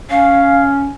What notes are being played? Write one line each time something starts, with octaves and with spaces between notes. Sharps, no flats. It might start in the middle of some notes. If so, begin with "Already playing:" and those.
C#4 F5